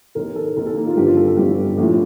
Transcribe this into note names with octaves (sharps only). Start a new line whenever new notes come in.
D#2 D#3 A#4
A4
D#2 D#3 A#4
A4
A#3
F4
G1 G2 F3 G4
F4
A4
A4
G1 G2 F3 G4
A#1 A2 F3